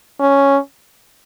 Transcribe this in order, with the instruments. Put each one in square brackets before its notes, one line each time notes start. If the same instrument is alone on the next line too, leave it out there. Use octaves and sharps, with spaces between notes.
[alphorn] C#4